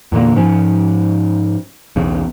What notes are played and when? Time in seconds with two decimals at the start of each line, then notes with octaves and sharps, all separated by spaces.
0.12 E2 A#2 D3 A#3
0.36 G#2 F3 C#4
1.96 B1 E2 C#3